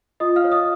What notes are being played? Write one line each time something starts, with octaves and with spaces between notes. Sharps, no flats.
F4 D#5 D#6
F5 F6
C#5
D#5 D#6